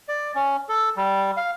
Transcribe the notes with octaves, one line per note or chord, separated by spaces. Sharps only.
D5
C#4
A4
G3
F5